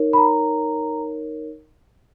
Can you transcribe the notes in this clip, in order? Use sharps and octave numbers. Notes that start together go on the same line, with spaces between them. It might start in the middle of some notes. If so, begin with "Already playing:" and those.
Already playing: D#4 A#4 C#5
B5
A#5